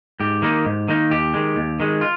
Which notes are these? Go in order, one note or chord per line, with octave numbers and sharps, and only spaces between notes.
G#2 G4
D#3 A#3 D#4
G#2
D#3 A#3 D#4
D#2 G4
D#3 G#3
D#2
D#3 G#3
F4